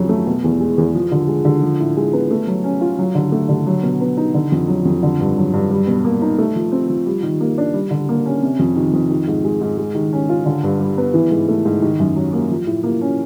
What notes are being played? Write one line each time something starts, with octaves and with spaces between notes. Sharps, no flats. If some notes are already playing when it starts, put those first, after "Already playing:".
Already playing: F2 C#3 F#3
A3
B2
E2
G#3
E2
F3
D3
G#3
D3
F3
A2
G#3
B3
A3
F#3
C#4
F4
F#3
D3
A3
D3
F#3
B2
B3
D#4
D3
F2
F#3
F2
D3
G2
F#3
G2
G3
B2
A#3
D#4
A3
F3
C4
F3
G3
D#3
A#3
D4
G3
D3
A#3
C#4
C3
F2
D#3
F2
D#3
G#2
G#3
G#2
G#3
D#3
C#4
F4
D3
G2
G3
B3
E3
G#2
A3
G#2
D#3
F#2
F#3
A#3
F3
A2
A#3
C#4